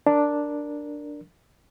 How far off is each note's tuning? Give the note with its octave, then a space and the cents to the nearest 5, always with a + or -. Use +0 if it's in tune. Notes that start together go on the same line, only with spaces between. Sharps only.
D4 +0 A#4 +0